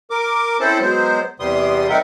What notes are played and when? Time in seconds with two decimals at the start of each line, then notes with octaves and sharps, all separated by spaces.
0.10 A#4 D6
0.60 C4 C#4 E4 A4 C5 A5
0.81 F#3 G#3 B3 C5
1.40 E2 C3 G3 B3 C6 D#6
1.89 G3 C4 D#4 A#4 E5 F#5